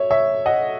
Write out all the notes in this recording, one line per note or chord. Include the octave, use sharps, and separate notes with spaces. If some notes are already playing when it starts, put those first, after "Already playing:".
Already playing: C#5 E5
C#5 E5
D#5 F#5